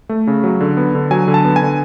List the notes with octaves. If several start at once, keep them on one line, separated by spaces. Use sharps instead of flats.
A3
C#3
F#3
D3
B3
D3
F#3 G#5
D3
A5
B3
G#5
D3